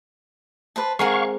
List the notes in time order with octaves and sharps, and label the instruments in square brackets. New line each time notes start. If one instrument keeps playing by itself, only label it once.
[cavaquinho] B4 C5 A5
[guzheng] G#3 C4 A#4 [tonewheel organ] F5 C#6 [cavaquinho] F#5 G#5 A#5